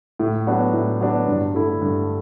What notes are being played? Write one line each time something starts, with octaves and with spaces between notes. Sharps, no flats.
A2
F#3 B3 D4
A2
F#3 B3 D4
G2
D3 A3 E4
G2